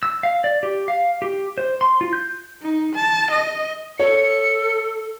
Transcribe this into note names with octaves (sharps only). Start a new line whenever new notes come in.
E6
F5
D5
G4
F5
G4
C5
C6
F4
G6
D#4
A5
D#5
A4 C#5 C#7